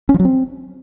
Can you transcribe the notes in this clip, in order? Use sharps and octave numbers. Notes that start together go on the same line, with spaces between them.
C#4
F3
F#3
C4